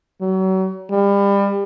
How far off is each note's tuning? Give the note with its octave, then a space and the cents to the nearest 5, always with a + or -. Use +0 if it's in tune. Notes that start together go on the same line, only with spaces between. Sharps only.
F#3 +35
G3 +30